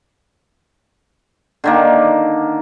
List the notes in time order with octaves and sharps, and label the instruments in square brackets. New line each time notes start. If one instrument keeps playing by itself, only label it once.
[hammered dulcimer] D3 D#3 A#3